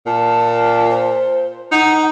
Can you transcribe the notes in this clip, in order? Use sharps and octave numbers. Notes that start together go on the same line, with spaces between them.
A#2 A5
C5
D#4 F#5